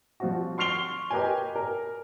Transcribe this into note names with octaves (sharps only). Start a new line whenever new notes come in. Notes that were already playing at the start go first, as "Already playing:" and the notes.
F3 G3 C4 F4 F#4
C6 C#6 F6 C7 F7 G7
G4 A#4 B4 D#5 G5 G#5
A#4